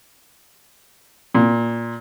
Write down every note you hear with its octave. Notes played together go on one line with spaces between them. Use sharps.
A#2